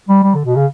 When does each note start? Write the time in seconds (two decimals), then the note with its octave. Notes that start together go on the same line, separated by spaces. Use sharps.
0.09 G3
0.23 G3
0.34 D3
0.45 B2
0.56 C#3